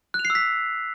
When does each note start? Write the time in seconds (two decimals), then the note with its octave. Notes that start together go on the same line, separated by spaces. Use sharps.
0.14 F#6
0.19 F7
0.25 C7
0.30 E6
0.35 B6